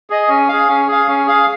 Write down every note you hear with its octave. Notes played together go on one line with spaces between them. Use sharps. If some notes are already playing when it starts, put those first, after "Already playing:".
G#4 D#5
C#4
G#4 F5
C#4
G#4 F5
C#4
G#4 F5